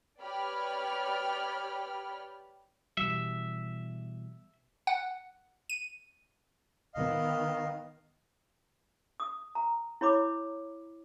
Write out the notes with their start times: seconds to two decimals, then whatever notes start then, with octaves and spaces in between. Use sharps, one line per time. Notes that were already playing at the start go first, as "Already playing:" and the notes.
0.20 G4 B4 C#5 D5 B5 F6
2.97 B2 E3 G3 E5
4.87 F#5
5.69 D#7
6.94 D#3 B3 D#5 F5
9.20 D#6
9.55 A#5
10.01 E4 C#5 B5 D6